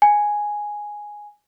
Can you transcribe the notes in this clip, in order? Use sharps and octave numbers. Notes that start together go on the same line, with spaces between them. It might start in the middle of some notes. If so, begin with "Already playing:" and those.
G#5